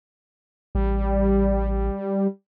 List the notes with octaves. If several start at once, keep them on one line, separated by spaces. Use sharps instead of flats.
A1 G3